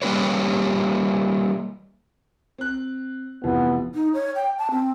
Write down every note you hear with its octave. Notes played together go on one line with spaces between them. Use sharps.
G3 A#3 C#4 G4 B4 C#5
C4 F#6
F1 E3 F3 B3
D#4
C#5
G5
A5
C4